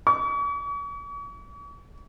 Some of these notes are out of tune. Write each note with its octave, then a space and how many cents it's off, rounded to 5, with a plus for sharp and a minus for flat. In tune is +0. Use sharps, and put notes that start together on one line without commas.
C#6 +40